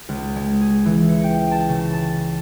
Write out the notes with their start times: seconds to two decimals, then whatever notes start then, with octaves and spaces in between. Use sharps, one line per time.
0.09 C#2
0.36 G#3
0.61 G#4
0.85 E3
1.09 C#7
1.24 G5
1.51 A5
1.69 C#3
1.93 A5